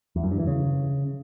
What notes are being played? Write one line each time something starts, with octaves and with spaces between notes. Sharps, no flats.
E2
F#2
G2
E3
C#3